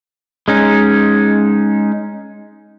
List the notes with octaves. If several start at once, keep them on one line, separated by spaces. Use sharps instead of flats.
G#3 C#4 D#4